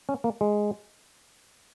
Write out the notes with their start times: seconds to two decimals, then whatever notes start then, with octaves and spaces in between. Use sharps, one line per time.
0.09 C#4
0.24 A#3
0.41 G#3